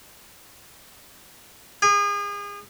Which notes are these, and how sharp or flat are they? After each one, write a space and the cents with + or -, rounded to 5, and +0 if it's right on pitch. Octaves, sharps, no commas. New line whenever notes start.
G#4 -35